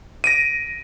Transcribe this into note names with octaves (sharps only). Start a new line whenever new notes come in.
A#6 D7 D#7